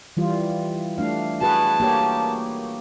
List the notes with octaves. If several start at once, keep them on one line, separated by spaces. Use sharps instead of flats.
E3 G3 F4
A3 D4 F5
F#4 G#4 B4 A5
A#3 G4 C#5